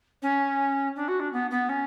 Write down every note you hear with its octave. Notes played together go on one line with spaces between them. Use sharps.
C#4
D4
F#4
D4
B3
B3
C#4